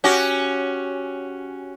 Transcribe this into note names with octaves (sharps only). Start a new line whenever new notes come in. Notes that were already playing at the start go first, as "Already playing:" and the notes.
C#4 F#4 G4